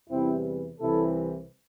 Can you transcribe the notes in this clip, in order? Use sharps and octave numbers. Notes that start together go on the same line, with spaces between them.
E2 C3 E3 G3 C4 E4
C2 C3 E3 E4 A4